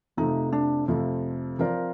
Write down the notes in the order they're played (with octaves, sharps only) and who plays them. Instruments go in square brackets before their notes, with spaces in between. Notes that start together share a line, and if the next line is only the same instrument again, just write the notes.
[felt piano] F2 C3 F3 A3 [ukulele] D#4
[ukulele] D4
[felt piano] F2 C3 F3 A3
F3 C4 F4 A#4 D5